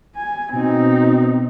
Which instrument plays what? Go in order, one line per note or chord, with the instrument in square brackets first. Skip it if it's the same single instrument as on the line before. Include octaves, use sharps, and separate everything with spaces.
[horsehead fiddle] G#5
[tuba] B2 [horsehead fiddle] C4 D#4